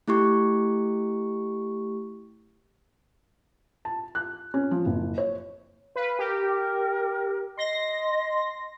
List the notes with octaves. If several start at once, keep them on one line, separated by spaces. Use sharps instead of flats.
A3 E4 G4 C#6
A5
F#6
C#4
F3
F#1
C#5
B4 F5
G4 A#4
D#5 C6 A#6